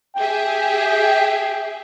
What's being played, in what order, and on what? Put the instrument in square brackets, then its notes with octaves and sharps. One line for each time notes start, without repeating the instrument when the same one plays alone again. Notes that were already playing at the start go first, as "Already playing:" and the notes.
[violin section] G4 G#4 E5 [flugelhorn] G5